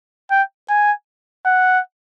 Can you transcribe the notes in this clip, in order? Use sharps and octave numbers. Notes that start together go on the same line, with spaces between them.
G5
G#5
F#5